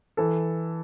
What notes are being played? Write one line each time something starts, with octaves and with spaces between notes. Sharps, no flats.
E3 A4